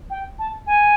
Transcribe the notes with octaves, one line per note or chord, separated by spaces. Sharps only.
G5
A5
G#5